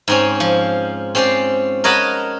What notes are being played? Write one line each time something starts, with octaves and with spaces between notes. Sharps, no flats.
G#2 C4 C#4
F3
C4 C#4 C5 D5
A#4 C#5 D#5 F#5 A5 B5